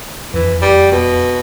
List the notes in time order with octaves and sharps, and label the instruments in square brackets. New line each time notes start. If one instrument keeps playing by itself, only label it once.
[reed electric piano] F2 [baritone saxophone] E3
[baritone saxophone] G3
B2